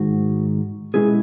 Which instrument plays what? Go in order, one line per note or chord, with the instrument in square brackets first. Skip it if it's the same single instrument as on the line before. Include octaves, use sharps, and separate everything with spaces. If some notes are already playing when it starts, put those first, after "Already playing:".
Already playing: [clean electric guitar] G#2 D#3 G#3 F#4
B2 G#3 C#4 E4 G#4